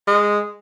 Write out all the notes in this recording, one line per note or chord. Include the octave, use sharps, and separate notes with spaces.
G#3